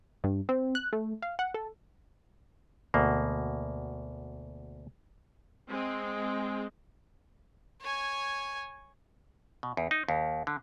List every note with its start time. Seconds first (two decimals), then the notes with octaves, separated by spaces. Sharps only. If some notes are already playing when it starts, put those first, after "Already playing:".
0.24 G2
0.49 C4
0.75 F#6
0.93 A3
1.22 F5
1.39 F#5
1.54 A4
2.94 D2 B2 A#3
5.70 G#3 C4
7.81 C#5 G#5
9.63 B2
9.77 E2
9.91 D#4
10.09 D#2
10.47 D3